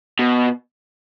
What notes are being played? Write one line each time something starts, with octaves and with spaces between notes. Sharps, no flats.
B2